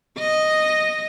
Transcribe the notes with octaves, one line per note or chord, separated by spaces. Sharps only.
D#5